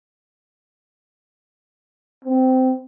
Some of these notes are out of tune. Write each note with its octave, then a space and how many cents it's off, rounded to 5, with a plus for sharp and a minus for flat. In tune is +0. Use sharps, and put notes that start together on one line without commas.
C4 -15